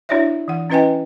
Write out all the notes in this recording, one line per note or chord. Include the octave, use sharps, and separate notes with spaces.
D4 E4 F#4 C#5 D5 E5
E3 F#5
C#4 E4 B4 D#5 G5 G#5